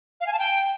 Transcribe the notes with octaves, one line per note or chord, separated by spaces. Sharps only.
F5
G#5
A5
G5